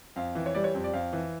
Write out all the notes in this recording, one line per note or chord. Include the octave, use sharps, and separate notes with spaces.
F2 F5
E3
C#5
G3 D5
C#5
F2
D5
F2 F5
E3